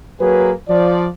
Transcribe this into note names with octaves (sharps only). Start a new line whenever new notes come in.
F#3 A#3 G#4 B4
F3 D5